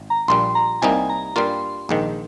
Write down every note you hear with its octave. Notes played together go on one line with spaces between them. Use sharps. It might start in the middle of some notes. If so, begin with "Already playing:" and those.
Already playing: G#1
A#5
A#1 A#2 G3 C6
A#5
C2 C3 G3 A#3 D#4 G#5
A#5
G2 G3 A#3 F4 C6
A#1 G#2 D#3